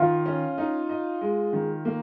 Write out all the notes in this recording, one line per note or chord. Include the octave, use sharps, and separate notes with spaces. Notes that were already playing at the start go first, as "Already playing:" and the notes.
Already playing: D#3 F4
C#4
D#4
D#5
G#3
D#3
A#3